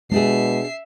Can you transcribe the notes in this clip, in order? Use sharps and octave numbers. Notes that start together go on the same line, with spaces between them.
B2 G#3 D4 G4 G#4 E5 C7